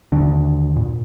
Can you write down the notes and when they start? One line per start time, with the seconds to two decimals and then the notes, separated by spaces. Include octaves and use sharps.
0.12 D#2 D3 D4
0.76 A#2